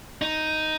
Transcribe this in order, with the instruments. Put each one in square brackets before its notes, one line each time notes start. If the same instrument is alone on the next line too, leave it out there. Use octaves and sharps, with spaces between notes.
[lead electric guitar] D#4